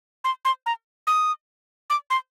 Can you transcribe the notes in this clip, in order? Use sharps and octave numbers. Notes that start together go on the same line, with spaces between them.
C6
C6
A#5
D#6
D6
C6